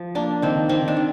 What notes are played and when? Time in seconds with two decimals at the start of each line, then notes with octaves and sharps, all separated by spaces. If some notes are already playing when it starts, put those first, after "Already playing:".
Already playing: F3
0.15 A#3 D4
0.42 D#3 C4
0.69 D#3 C4
0.88 D4
0.97 D#3